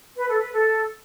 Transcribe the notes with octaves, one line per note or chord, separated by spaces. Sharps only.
B4
A4
B4
A4